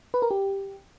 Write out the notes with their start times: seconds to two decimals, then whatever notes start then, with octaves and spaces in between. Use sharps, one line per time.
0.14 B4
0.22 A#4
0.31 G4